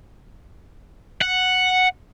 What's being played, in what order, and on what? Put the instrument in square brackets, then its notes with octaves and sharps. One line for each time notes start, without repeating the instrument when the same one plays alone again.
[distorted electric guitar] F#5